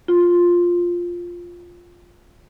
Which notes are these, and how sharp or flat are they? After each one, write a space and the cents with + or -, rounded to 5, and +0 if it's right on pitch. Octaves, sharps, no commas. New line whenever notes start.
F4 +5